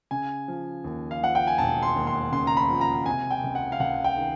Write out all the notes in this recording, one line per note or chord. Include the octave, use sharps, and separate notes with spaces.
C#3 G#5
F3
D#2
F5
F3 F#5
G5
G#5
E1 A5
C6
D#2
C6
C#3 C6
A#5
B5
F3
A#5
C3 G#5
G5
C#2
F#5
F5
C#2 F#5
G5
D#3